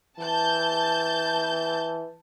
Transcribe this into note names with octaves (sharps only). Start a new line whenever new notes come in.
E3 A5 G6